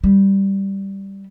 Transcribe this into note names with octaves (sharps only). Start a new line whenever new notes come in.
G3